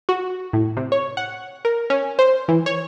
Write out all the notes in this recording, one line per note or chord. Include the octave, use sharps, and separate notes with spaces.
F#4
A2
C3
C#5
F#5
A#4
C#4
C5
E3
C#5